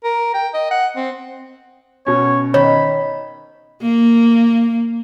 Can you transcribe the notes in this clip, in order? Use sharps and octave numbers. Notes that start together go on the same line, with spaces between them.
A#4
G5
D#5
F#5
C4
B2 C#4 C#5
D#3 C#5 B5
A#3